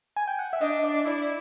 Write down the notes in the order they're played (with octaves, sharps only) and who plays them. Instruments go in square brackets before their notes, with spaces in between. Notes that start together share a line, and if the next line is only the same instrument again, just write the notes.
[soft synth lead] G#5
G5
F#5
E5
[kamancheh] D4 [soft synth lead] D#5
[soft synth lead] D5
[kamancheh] E4 [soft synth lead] D5